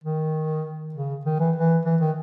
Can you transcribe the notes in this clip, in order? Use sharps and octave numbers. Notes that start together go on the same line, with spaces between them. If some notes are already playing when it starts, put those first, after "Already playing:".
D#3
C#3
D#3
E3
E3
E3
D#3